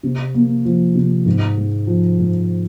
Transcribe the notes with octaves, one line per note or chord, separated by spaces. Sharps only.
C3
A#3
F3
C3
G#2
G#3
F3
G#2